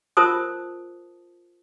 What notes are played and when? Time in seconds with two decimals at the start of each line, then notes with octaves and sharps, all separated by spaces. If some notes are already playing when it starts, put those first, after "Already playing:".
0.17 F4 A#4 C5 A5 D#6